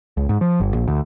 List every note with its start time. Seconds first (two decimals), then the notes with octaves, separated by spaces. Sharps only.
0.17 C#2
0.29 G#2
0.41 F3
0.60 G1
0.74 A#1
0.88 D2